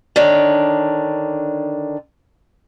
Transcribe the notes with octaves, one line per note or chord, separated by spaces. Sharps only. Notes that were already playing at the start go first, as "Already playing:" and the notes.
D3 D#3 D4 C#5